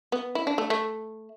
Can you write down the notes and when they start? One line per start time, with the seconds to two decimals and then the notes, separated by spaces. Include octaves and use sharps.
0.12 B3
0.35 E4
0.47 D4
0.58 A3
0.70 A3